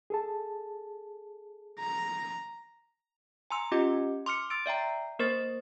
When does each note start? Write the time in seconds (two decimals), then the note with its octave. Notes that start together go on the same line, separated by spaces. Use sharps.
0.10 G#4 A4 A5
1.80 A#5
3.50 G#5 A#5 C6 E6
3.72 C#4 F4 G4 D#5 D6
4.26 C6 D6 F6 C#7
4.50 C6 E6 A6 D7
4.66 D5 E5 G5 A#5
5.19 A#3 A#4 C5 C#6 A6